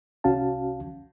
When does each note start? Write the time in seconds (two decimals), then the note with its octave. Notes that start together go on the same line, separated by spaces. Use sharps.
0.24 C2 C#4 F#4 F5 A5